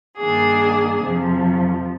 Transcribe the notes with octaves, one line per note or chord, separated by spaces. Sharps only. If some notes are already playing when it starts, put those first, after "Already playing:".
G2 D#3 A#3 D4 G#4
F2 C3 F3